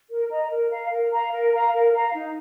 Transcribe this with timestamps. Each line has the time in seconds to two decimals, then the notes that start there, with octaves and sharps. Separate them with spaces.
0.09 A#4
0.30 D#5 A#5
0.51 A#4
0.71 F5 A#5
0.91 A#4
1.12 F5 A#5
1.32 A#4
1.53 F5 A#5
1.73 A#4
1.93 F5 A#5
2.14 D#4